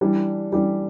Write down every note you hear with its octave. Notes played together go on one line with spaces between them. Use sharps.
E3 G3 D4 G4 D5
E3 G3 D4 G4 D5